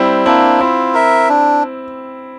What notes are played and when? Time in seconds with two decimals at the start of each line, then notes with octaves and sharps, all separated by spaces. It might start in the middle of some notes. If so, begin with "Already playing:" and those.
Already playing: G3 C4 E4
0.26 A#3 C4 D4 E4
0.61 C4 E4 F4
0.94 A#4 E5
1.29 D4